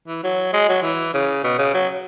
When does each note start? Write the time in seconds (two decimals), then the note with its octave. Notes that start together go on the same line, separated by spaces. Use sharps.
0.08 E3
0.24 F#3
0.53 G#3
0.69 F#3
0.83 E3
1.14 C#3
1.44 B2
1.58 C#3
1.74 F#3